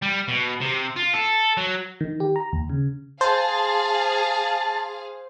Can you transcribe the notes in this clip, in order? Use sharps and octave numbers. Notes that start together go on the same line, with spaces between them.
G3
B2
C3
F4
A4
F#3
D#3
G4
A#5
D#2
C#3
G#4 C5 F5 A5